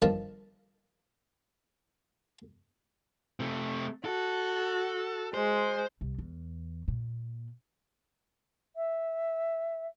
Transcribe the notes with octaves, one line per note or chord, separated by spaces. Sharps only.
G2 D#3 F3 A#4 A5
C3 A3
F#4 A4
G#3 C5
C2
E2
A#2
E5